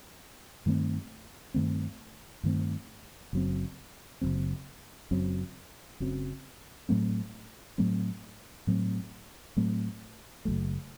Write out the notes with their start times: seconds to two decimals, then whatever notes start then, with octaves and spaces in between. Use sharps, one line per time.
0.66 G2 D#3 A3 C4
1.54 G2 D#3 A3 C4
2.43 G2 D#3 A3 C4
3.33 F#1 F#2 F#3 C4
4.21 F#1 F#2 F#3 C4
5.11 F#1 F#2 F#3 C4
6.00 F#1 F#2 F#3 C4
6.89 A2 F#3 A3 C4
7.78 A2 F#3 A3 C4
8.67 A2 F#3 A3 C4
9.57 A2 F#3 A3 C4
10.45 F#1 F#2 F#3 A3